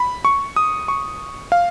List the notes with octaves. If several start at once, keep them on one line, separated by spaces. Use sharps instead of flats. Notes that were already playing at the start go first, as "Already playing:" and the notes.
Already playing: B5
C#6
D#6
C#6
F5